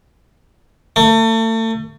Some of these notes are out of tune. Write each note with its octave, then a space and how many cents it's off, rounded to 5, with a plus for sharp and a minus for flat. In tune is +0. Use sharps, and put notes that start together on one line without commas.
A3 +35